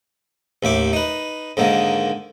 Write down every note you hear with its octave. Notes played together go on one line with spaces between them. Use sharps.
A1 D#2 E5 D6
D#4 B4
G#2 D3 D#3 A#3